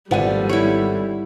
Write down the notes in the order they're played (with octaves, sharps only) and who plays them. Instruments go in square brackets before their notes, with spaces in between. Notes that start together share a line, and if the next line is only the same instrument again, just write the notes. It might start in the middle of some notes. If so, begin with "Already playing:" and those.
[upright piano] G#1 F#5 D#7 [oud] D3 B3 [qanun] F3 [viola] G3
[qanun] E4 C#5